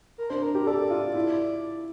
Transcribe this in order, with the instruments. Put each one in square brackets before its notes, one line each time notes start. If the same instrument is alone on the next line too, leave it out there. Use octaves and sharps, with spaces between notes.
[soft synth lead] A#4
[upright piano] D4 [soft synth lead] C5
[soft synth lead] A#4
[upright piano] G4 [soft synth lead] A#4
[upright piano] A4 [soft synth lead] D5
[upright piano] F4
E4